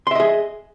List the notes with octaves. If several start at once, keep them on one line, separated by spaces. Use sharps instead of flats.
G#4 D#5 E5 C6